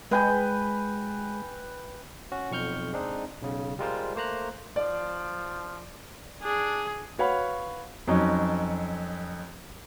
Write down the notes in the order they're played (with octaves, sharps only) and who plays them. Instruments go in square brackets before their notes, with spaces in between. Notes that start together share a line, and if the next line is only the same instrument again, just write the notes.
[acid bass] G#3 [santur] B4 G5 G#5
[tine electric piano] C#4 F#4
B1 F2 C#6 F6 G6
G#3 C4 D4 D#4
B1 C#3
G3 G#3 F4 A#4 C5
A3 A#3 C5 A#5 F#6
[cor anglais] F3 [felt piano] D5
[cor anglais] D4 [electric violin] G#4
[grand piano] F#4 B4 C#5 F5 F#5 B5
F2 F#3 C#4 D#4